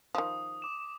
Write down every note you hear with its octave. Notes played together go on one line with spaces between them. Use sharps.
D#3 F3 D#6
D6 E7